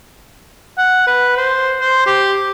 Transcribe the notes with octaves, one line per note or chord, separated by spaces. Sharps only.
F#5
B4
C5
C5
G4